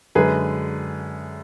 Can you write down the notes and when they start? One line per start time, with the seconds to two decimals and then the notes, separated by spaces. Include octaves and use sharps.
0.15 F#2 D3 G#3 G#4 B4